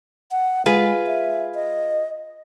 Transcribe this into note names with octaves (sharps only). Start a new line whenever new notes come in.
F#5
G#3 F4 G#4 B4
E5
D#5